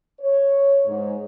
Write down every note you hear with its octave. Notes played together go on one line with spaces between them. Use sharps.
C#5
G#2